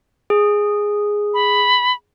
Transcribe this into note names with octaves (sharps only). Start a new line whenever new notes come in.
G#4
B5